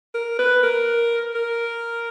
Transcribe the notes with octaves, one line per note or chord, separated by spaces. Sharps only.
A#4
B4
A#4
A#4